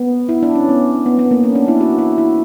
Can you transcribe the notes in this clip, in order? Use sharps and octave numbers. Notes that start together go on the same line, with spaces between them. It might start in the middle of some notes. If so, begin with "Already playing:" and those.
Already playing: B3
E4
D4
C#4
B3
B3
B3
A#3
C#4
D4
E4
F#4
E4
E4